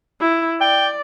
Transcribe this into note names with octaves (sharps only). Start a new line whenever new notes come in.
E4
D5 G5